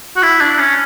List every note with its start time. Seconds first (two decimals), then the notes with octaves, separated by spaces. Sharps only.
0.16 F#4
0.23 E4
0.41 D4
0.59 C#4